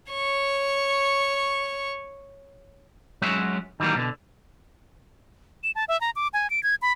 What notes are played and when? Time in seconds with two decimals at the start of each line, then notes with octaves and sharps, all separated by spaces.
0.12 C#5 C#6
3.22 F#3 G#3 C#4 F#4 E5
3.80 D#3 E3 F#3 G3 A#3
3.96 B2 D3
5.63 E7
5.75 A5
5.88 E5
6.01 A#5
6.16 D6
6.33 G#5
6.50 D7
6.63 G#6
6.82 B5